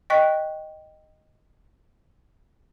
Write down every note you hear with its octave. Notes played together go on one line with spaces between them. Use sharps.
D#5 G5 C#6 F#6 B6